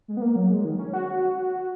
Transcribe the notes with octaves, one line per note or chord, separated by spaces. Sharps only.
G#3
B3
A#3
F#3
G#3
D#3
C#4
F#4